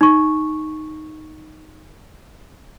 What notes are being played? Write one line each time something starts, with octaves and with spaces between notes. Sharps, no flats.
D#4 C#6